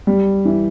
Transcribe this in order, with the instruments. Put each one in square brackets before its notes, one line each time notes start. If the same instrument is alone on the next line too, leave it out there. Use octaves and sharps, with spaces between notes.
[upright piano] G3
E3